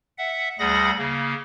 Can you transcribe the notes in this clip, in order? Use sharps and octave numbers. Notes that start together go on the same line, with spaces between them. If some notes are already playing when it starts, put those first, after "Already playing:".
E5 F#5
D2 G3 G#4 F#5 B5 A#6
C#3 A#3